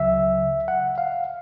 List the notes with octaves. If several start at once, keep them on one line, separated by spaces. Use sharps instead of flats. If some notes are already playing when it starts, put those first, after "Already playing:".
Already playing: C#2 C#3 F#3 E5
F#5
F5